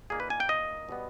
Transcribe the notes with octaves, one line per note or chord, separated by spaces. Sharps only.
A#2 A#3 D#4 G#4
B4
G#5
G5
D#5
B2 G3 B3